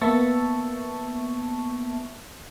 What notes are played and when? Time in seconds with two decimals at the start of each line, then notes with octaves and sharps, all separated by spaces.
0.01 A#3 B3 E5 A5 C#6